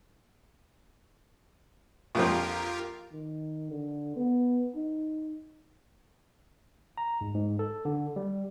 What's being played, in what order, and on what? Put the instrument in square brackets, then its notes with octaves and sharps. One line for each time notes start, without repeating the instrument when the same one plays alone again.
[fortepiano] A#1 F2 F3 [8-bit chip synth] F4 G4 A#4
[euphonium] D#3
D3
B3
D#4
[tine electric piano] A#5
G#2
G#2
A4
D3
G3